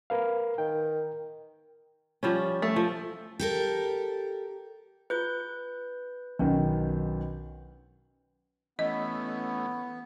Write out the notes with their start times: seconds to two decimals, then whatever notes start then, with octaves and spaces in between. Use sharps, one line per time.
0.10 A#4 B4 F5
0.58 D#3 G5
2.23 F3 G3 C#4
2.62 A3
2.76 F3
3.39 G4 A4 A#4
5.10 F4 G#4 B4 G6
6.39 B1 D#3 C#4 D4
8.79 E3 A3 B3 C#4 D#5